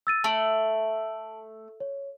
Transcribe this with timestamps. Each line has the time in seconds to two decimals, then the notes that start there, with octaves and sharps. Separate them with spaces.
0.07 E6 A6 D#7
0.24 A3 A5 D7 F#7
1.80 C#5